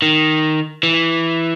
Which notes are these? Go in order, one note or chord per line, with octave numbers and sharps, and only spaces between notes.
D#3
E3